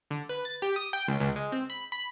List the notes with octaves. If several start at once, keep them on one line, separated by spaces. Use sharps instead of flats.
D3
B4
A6
G4
D#6
G5
C#2
C#2
G#3
C4
B5
B5